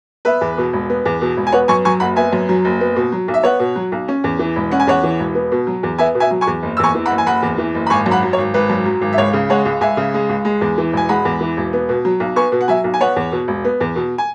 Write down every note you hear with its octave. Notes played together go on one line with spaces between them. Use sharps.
B3 B4 E5
E2
B2
E1
B3
E2
B2
E1
G#5
B3 C#5 F#5
F#2 G#5 C#6
F#3 G#5 C#6
F#1 F#5 B5
B3 E5 G#5
F#2
F#3
F#1
B3
B2
F#3
B1
E5
B3 C#5 F#5
B2
F#3
B1
C#4
E2
E3
E1
C#4 F#5
G#5
E2 C#5 F#5
E3
E1
B3
B2
F#3
E2
B3 E5 G#5
B2
E5 G#5
F#3
G#5 C#6
E2
F#1
E6
E2 G#5 C#6
E3
F#5 B5
F#1
G#5
F#1 F#5 B5
E2
E3
F#1
B5
G#1 G#5 C#6
F#2
F#5 B5
F#3
C#5
G#1
G#1 B4
F#2
F#3
G#1
E5
C#2 C#5
C#3
G#3 C#5 F#5
C#2
C#2 E5 G#5
C#3
G#3
C#2
G#3
E2
E3
E1 G#5
G#3 F#5 B5
E2
E3
E1
B3
B2
F#3
B1
B3 G#5 C#6
B2
F#5
F#3 E5 G#5
B1
G#5
B3 C#5 F#5
E2
B2
E1
B3
E2
B2
G#5